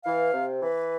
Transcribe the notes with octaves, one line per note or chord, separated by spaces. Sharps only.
E3 F5
C3
E3 B4